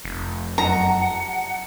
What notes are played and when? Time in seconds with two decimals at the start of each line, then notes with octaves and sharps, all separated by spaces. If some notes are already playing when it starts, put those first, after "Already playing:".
0.05 F1
0.58 F#2 D#5 F#5 A5 A#5